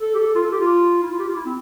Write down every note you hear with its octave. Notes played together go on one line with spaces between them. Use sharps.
A4
G4
A4
F4
A4
G4
F4
E4
F4
G4
F4
E4
C4